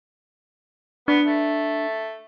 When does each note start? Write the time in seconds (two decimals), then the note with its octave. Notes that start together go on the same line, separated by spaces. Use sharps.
1.08 B3 D4
1.25 A3